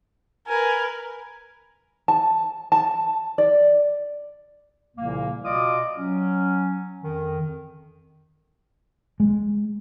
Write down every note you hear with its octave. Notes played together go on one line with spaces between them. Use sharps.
A#4 B4 G#5
A5
A5
D5
C2 A#2 C#3 F3 A#3
B2 F4 D5 D#5 D6 D#6
F#3 C#4
F2 D#3
G#3